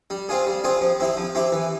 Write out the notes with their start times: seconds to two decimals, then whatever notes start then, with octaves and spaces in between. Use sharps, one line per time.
0.10 G3
0.29 C4 F4 G#4
0.46 G3
0.64 C4 F4 G#4
0.81 F3
1.00 C4 E4 G4
1.17 F3
1.35 C4 E4 G4
1.52 E3